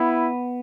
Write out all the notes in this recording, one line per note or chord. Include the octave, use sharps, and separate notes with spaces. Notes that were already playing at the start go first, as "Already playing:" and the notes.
Already playing: B3 E4